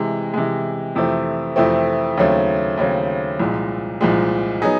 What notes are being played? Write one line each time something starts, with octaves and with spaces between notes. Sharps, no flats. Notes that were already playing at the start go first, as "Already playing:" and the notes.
Already playing: C3 E3 G#3
C3 E3 G#3
F2 C3 E3 A3 C4
F2 C3 E3 A3 C4
D#2 C#3 F#3 A3 C4
D#2 C#3 F#3 A3 C4
C2 A#2 F3 G#3
C2 A#2 F3 G#3
F#3 B3 D#4 G#4